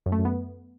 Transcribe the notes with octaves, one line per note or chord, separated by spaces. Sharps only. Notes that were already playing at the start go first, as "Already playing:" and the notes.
F#2
A3
F#2
B3